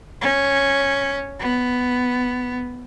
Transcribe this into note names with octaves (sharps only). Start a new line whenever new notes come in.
C#4
B3